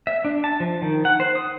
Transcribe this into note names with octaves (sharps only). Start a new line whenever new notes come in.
E5
D4
A5
F3
D#3
F#5
C5
D#6